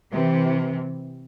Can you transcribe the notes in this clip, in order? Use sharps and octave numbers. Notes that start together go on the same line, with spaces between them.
C3 E3